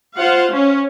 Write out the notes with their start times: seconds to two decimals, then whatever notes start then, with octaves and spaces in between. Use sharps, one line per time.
0.17 F4 C5 F5 F#5
0.51 C#4